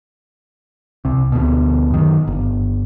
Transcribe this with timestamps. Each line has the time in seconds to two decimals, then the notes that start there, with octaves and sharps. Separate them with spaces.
1.05 C2 C3
1.32 D2 B2
1.90 F#2 D#3
2.27 G1